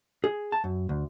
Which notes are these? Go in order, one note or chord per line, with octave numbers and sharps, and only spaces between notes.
G#4
A5
F#2
D2